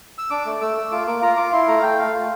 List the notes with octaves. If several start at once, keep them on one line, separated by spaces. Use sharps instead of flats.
E6
D4 D6
A3
A3 E6
A3
F4 D6
A#3 D6
F4 A#5
F4 D6
E4 C6
A3 A#5
F5
A3 G5
A3 F5
F4